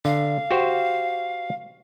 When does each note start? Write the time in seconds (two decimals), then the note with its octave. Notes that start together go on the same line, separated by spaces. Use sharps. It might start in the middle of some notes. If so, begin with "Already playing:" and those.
0.05 D3 F5
0.51 F#4 G4 C5